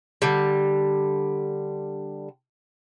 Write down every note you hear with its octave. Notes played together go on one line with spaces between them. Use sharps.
D3 G3